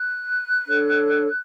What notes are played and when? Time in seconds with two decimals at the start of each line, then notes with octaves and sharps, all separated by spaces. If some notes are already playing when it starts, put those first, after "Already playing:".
Already playing: F#6
0.67 D4 A4 C#5